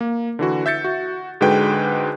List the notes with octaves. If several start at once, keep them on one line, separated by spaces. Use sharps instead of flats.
A#3
D3 E3 F#4
E5 G6 A6 C#7
F#4
G#2 D3 G#3 F#4 B4 G5